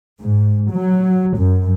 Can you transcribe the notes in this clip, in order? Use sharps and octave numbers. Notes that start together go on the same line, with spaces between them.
G#2
F#3
F#2